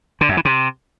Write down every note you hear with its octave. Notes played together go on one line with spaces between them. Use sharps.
D3
F#2
E3
C3